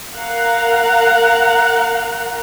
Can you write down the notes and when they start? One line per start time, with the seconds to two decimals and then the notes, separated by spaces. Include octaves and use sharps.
0.15 A#4 F5 F#5 A#5